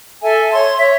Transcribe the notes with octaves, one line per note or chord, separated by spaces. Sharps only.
A4 E5 G#5
C#5 C6
C#5 E5